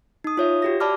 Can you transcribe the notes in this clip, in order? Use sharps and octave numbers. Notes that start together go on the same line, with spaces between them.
D#4 D#6
F4 C#5 E5
F#4 G4 A#6
D5 A5 B5 D6 F6